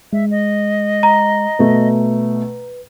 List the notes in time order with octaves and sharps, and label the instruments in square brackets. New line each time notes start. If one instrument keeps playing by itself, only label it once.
[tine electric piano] G#3 [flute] E5
[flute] D#5
[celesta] A#5
[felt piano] B2 A3 [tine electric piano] B4